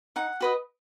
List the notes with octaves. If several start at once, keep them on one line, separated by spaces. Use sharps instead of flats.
D#4 F#5
F#4 B4 D#5